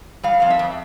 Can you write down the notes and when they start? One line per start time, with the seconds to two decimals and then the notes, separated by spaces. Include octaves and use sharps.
0.23 G3 F5
0.40 F2 F5
0.50 E5
0.59 F2